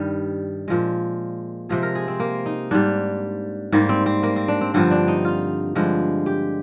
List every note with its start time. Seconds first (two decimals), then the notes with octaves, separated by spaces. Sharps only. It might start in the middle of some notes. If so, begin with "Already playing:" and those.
Already playing: G2 D#3 G3
0.68 A#2 F3 G#3
1.69 C3 F3 G#3 G#4
1.83 A#4
1.95 G#4
2.08 C4
2.20 A#3
2.46 D#4
2.71 G#2 G3 D4
3.72 G#2 G3 A#3
3.89 C4
4.06 C4
4.23 A#3
4.36 C4
4.48 D4
4.61 C4
4.74 G2 D3 F3 C4
4.91 D4
5.08 D#4
5.25 F4
5.75 G2 D3 F3 G#3
6.26 G4